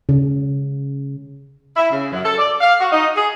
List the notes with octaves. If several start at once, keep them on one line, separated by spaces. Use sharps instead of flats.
C#3
E4
C#3
F#2
A4
D5
F5
F#4
D#4
G#4